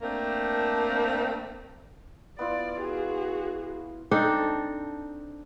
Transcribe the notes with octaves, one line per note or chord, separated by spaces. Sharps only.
A3 A#3 C4 D4
B3 E4 F4 D5
F#4 G#4
C4 D4 D#4 A4